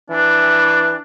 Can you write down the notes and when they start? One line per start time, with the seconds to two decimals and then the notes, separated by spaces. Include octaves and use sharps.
0.10 E3 D4